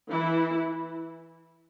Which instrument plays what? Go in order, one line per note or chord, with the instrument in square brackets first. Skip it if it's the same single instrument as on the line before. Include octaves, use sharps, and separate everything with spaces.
[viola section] E3 E4